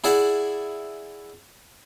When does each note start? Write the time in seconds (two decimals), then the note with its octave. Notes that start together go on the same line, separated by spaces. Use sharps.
0.04 E4 G#4 D5 E5 F#5